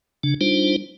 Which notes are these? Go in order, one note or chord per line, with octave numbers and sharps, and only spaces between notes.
C#3 D4
G3 D4 D#4 F4 C5